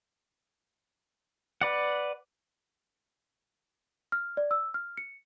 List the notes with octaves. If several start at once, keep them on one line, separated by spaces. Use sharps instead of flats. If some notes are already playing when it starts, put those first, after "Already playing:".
B4 D5 F#5
F6
D5
E6
F6
C#7